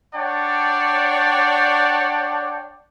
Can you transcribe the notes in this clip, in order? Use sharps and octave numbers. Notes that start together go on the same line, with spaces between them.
D4 C#5 D5 F#5 G5 A5